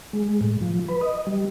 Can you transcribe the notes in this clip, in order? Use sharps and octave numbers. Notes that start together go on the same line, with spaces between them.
G#3
A2
F3
B4
D#5
G3